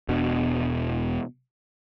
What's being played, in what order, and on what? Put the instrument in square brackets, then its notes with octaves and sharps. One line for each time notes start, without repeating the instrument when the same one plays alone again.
[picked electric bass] E1 E2 B2 D4